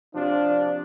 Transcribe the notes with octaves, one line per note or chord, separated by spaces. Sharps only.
C3 F3 D4